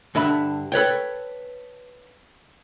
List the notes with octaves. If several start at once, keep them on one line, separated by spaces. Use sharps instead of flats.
G2 D3 E5 B5
A4 B4 C#5 G5